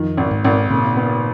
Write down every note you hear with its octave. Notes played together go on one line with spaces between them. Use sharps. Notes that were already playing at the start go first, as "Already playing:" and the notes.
Already playing: F2 D#3 F3
G#1
G#2 G#3
G#1
A#2 C#3 A#3
B3